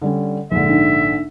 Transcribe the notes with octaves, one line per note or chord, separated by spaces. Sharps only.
D3 G3 C#4
A#1 G#2 D3 E5
D4 D#4